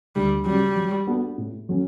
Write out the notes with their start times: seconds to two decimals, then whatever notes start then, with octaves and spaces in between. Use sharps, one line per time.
0.16 D2 G3
0.45 C#3 F#3 G3
0.76 F#3
1.07 B3 D4 F#4 A4
1.38 A2
1.69 F#3 A3 C#4